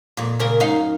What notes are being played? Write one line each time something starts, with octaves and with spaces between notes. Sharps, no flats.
F2 A#2
A#2 C#3 A#4
F#2 D#4 F5